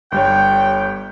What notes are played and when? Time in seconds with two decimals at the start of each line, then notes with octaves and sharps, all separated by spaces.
0.12 G1 G3 C#5 G5